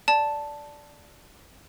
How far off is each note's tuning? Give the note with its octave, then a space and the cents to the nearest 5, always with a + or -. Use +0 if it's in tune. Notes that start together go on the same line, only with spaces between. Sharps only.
D5 -5 A5 +0